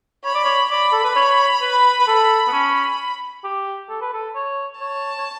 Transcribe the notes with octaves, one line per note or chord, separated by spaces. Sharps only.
C#5 B5
D5
C#5
D5 B5
A4
B4
C#5
B4
B4
A4
B3
C#4
G4
A4
B4
A4
C#5
C#5 A5
C#5